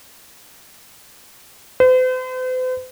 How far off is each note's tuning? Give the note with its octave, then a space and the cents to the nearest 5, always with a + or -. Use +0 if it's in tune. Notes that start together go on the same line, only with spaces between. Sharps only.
C5 -45